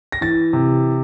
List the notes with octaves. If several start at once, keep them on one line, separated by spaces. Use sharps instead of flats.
A#6
E3 A6
C3